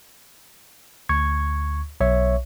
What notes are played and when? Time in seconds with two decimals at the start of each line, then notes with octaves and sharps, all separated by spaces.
1.09 D2 C#6 G#6
2.00 B1 C#5 E5 C#6